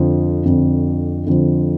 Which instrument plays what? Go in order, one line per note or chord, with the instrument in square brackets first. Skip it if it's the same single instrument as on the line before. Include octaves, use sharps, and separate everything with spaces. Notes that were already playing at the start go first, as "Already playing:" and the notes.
Already playing: [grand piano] F2 D3 F3
F2 D3 F3
F2 D3 F3